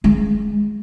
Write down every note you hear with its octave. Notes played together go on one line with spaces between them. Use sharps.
G#3